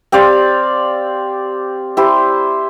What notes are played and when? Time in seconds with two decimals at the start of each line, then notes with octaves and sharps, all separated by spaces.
0.12 C4 G4 D5 F5
1.97 E4 G4 C5